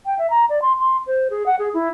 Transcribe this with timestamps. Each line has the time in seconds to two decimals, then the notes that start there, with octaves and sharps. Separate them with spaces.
0.06 G5
0.19 E5
0.30 A#5
0.49 D5
0.62 C6
0.79 C6
1.07 C5
1.30 G#4
1.46 F#5
1.59 G#4
1.74 E4